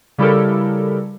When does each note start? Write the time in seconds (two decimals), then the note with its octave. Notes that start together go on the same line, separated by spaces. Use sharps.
0.18 C#3 G3 E4 G4 A4 A#4